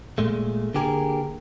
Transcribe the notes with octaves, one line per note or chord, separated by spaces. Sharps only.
A#2 G#3 A3
D3 A#3 G4 G#4 A#4